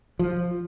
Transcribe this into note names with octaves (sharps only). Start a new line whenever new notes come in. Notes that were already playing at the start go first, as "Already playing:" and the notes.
F3